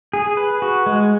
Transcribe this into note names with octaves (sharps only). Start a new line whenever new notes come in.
G#4
B4
F#4
G#3